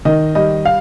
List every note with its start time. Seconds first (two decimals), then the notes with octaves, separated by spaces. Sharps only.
0.05 D#3 D#5
0.35 G3 D#5
0.65 F5